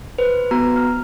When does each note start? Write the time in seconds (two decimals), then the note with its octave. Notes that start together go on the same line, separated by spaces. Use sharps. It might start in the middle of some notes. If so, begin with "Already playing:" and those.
0.18 B4 C5
0.51 B3 F#4 A#5
0.76 F6